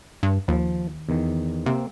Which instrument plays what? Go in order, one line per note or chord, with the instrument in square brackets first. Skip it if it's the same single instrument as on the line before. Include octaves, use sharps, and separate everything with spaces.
[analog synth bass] G2
[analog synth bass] D#2 [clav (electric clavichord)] F3
[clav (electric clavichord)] E2 D#3
[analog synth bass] C3 [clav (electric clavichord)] A#3 C4